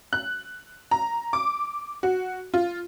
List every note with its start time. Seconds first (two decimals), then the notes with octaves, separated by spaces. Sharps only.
0.13 F#6
0.91 A#5
1.33 D6
2.03 F#4
2.54 F4